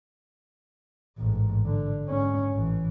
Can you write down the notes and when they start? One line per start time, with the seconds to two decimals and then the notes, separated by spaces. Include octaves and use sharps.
1.18 A1 G#2
1.65 D3
2.04 G#2 C#4
2.54 A1 E3